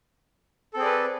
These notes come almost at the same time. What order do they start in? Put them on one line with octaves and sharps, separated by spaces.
A4 C4 G#4 D5 B4